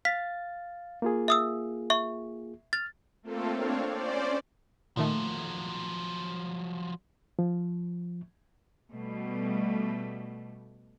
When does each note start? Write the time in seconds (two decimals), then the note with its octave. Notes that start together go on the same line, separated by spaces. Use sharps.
0.05 F5 A6 B6
1.02 A#3 F4 G#4
1.28 E5 D#6 E6
1.90 E5 C#6
2.73 F6 A6
3.23 A3 A#3 C4 F4 A4
3.53 C4 D4 C#5 F5
3.88 C#4 C5 D5
4.97 A#2 D#3 F3 F#3 A3
7.39 F3
8.92 B2 G3 A3